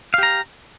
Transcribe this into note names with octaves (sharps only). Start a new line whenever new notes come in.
G4 F5 A#5